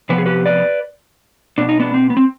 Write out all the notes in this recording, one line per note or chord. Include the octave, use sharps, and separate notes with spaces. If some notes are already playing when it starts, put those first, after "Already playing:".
C3 F3 B3 B4
G#4
G4 B4
B4 D5
B2 B3 D4
D#4
B3 D4
C4
B3
C4